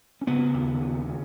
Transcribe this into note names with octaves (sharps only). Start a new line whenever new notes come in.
C#4
C#3 B3
D#2
C#3
C#3